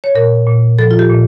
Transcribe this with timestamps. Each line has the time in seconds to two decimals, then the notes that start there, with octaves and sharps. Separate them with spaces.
0.04 C#5
0.15 A#2 A#4
0.47 A#2
0.79 F3 A4
0.91 F4
0.99 G4
1.09 A#2